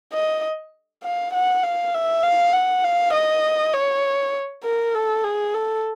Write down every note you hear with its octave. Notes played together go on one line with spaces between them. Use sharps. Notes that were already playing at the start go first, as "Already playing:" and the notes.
D#5
F5
F#5
F5
E5
F5
F#5
F5
D#5
C#5
A#4
A4
G#4
A4